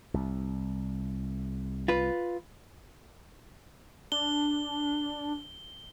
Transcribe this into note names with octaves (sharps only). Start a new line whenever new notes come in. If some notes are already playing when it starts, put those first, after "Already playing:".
C2
F4 B4
D4 G7